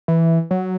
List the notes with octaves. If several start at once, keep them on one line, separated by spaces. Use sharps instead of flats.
E3
F#3